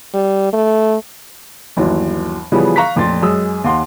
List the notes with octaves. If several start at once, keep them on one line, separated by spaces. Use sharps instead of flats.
G3
A3
G1 D#2 E3 F#3
C#3 E3 F3 G3 B3 G#4
F5 A#5 C#6 F#6 B6
A1 F2 A#2 C6 A6
F#2 G#3 G#4 D#6 E6
D#2 F5 F#5 C6